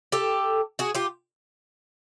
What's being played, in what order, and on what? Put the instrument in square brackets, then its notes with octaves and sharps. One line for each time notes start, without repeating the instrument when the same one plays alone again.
[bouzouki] G4 A4
F#4 G#4
F4 G4